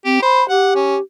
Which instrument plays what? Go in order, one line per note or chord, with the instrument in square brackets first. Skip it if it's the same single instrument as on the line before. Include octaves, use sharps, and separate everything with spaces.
[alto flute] C4 [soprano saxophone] G4
[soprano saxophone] C5 [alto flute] B5
[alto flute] G4 [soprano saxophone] F#5
[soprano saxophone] C#4